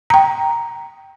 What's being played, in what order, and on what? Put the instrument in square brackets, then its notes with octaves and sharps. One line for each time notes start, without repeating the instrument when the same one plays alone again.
[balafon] G5 A#5